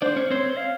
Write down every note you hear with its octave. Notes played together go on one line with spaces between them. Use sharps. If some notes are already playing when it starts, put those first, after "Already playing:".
D4 C5 D5
C#4 C#5
C4 C5 C#5
C#5
F5